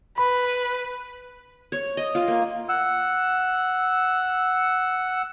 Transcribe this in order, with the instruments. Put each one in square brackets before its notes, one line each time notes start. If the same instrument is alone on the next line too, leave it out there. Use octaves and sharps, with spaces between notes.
[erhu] B4 [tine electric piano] B5
[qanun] C#5
D#5
F4
A#3
[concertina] F#5 E6